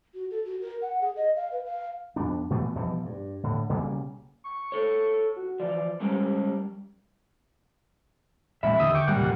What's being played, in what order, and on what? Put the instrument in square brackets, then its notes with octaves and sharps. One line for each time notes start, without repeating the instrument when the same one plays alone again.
[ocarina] F#4
A4
F#4
A#4
F#5
G#4
D#5
F5
B4
F5
[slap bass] F2 B3 D4
A#2 E3 A3 B3
B2 E3 F3 G3
G2
A2 D3
B1 C#3 G3 A#3
[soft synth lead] C#6
[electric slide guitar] A4 C#5
[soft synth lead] F#4
[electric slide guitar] E3 F3 [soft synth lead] D5
[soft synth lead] G3 [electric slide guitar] G#3 C#4 A#4
[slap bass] A1 A#2 G#3 [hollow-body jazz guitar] E5 [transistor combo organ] B5
[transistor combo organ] D#2 D#6 E6 [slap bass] D3
[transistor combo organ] G5 C#6 D6
[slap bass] G#1 [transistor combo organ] A#2 F#5 [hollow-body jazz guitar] G3
[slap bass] E1 C2 F2